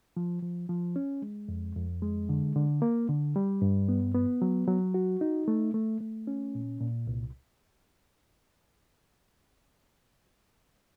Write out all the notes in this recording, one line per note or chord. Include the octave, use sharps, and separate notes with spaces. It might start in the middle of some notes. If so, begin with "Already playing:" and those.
F3
F3
F3
C#4
G#3
F2
F2
G#3
D3
D3
A#3
D3
G3
G2
B3
B3
F#3
F#3
F#4
D#4
A3
A3
A3
C#4
A#2
A#2
C2